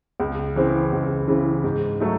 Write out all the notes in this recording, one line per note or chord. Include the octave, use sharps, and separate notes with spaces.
C#2
C#3 E3 C4
C#2
C#3 E3 C4
G#2
F#3 A3 D#4